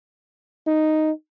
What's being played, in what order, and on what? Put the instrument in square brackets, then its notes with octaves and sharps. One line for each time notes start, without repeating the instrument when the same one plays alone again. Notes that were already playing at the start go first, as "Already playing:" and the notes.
[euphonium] D#4